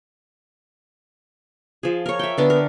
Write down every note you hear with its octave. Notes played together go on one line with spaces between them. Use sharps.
F3 G#4
A#4 C#5
E5 G5
D3 B3 D4
A#4